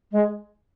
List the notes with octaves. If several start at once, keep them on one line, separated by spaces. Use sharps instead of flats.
G#3